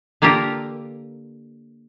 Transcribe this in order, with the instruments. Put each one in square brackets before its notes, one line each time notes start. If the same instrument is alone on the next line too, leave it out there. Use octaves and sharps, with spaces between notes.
[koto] D3 A#3 F4 G4 A#4